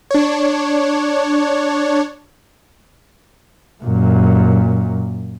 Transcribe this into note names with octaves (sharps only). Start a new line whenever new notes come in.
D4 C#5
F#2 A#2